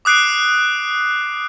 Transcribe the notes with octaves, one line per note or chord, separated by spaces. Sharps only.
D6 D#6 F#6 C7 D7